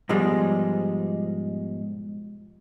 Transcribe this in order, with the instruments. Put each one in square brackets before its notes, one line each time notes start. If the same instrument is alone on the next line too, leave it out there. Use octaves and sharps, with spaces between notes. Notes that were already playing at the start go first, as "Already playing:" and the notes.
[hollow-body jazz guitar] G#2 B2 F3 G3 G#3